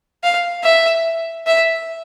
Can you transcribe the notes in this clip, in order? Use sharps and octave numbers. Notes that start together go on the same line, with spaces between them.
F5
E5
E5